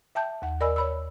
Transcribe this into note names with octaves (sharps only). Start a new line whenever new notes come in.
E5 G5 A5 G6
D#2 F#5
A#4 D5 D#5 G#5 B5 E6
C#5 B5 E6